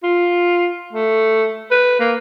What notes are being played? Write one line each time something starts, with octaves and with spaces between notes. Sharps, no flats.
F4
A3
B4
A#3